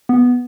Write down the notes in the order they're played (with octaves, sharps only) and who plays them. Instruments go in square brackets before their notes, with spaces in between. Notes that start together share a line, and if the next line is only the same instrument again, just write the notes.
[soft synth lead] B3